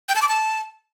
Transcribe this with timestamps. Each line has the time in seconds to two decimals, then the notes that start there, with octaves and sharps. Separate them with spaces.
0.09 G5
0.15 A5
0.22 D6
0.29 A5